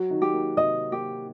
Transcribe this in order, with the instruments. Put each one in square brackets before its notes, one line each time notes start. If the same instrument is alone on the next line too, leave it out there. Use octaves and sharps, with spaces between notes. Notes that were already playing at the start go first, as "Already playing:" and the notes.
Already playing: [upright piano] F#3 F#4
D#3 D#4
[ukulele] G4
[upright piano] A#3
[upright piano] C3 C4 [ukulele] D#5
[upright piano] A#3 [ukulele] G4